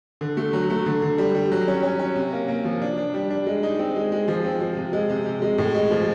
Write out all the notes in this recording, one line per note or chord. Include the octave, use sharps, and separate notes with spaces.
D3
A3
F#3
A3
D3
D3
G3
G3
F#3
C#4
C#4
C#4
C3
A#3
A#3
F3
D4
D4
G3
D4
G#3
D#4
C4
G#3
G#3
F3
C4
F3
C3
G#3
C3
C3
G#3
A2
G#3
F3